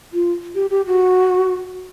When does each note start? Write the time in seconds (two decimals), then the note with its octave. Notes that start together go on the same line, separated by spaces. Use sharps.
0.13 F4
0.55 G4
0.70 G4
0.87 F#4